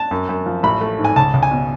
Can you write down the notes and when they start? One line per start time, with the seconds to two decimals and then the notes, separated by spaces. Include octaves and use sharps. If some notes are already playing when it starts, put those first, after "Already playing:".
Already playing: A5
0.11 F#2
0.29 F#2
0.46 F3
0.63 A1 B5
0.81 A3
0.99 G#2
1.05 G#5
1.16 C#2 A5
1.34 C#2
1.43 G#5
1.51 B2